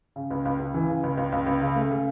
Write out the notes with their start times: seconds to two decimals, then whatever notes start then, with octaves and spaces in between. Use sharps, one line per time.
0.16 C#3
0.31 C#2
0.45 C#2
0.60 C#2
0.74 E3
0.89 C#3
1.03 C#2
1.17 C#2
1.32 C#2
1.46 C#2
1.61 C#3
1.76 A3
1.91 C#3